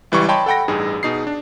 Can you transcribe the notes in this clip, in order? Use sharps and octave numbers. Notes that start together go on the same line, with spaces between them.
C#2 E3 G3 C#6
C#5 D#5 G5 A5 B5 C6
A4 F#5 G5 B5 A#6
A1 G2 D#4 G#4
B2 D#4 G#4 C7
D4